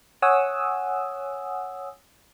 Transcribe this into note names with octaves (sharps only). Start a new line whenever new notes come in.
C#5 F#5 G#5 D#6 E6